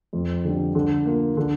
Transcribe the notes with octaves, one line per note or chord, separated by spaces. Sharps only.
F2
D3 G3
D3
A#3 F4
D3